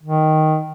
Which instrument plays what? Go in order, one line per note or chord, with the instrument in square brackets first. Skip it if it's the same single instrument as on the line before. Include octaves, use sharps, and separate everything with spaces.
[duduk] D#3